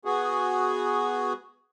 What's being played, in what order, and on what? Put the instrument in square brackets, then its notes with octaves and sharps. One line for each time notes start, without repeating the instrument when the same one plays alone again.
[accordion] B3 F#4 G#4